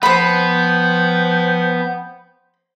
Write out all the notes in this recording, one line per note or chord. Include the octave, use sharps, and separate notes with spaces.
F3 B3 C5 G5 B5